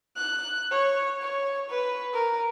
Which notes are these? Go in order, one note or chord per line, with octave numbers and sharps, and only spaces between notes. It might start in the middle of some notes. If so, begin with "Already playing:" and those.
F#6
C#5
C#5
B4
A#4